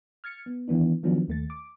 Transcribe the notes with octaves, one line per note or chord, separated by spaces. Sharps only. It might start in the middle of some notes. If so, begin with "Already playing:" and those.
F6 G#6 A6 C#7
B3
D#3 E3 B3 D4
D#3 F3 F#3 B3 C#4 D4
D#2 A3 A6
D6